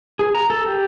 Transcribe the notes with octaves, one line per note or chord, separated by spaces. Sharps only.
G#4
A#5
A4
G4